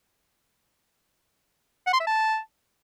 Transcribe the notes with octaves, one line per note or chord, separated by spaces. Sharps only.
F#5
C6
E5
A5